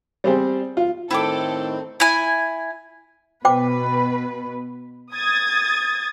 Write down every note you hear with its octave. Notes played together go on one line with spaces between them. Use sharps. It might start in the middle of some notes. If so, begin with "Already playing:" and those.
G3 C4 G4 G#4 C5
F4
A2 D#3 C4 E4 A4 G5 D6
E4 G#5
B2 B4 C5 G5 D6
D#6 G#6 A6